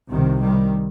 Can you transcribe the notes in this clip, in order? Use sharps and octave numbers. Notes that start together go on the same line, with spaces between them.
C2 C3 D#3
D#3 G3